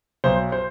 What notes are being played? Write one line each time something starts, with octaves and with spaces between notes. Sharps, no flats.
B1 C5
C5